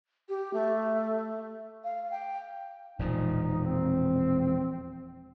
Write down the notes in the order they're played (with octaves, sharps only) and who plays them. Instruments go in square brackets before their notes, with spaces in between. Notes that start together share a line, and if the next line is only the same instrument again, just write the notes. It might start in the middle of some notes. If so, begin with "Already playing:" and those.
[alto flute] G4
A3
F5
G5
[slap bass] E1 A#2 F3 [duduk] D#4
[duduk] C4